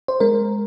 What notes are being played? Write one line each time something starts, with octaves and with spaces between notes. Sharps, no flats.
C5
G#3 A#4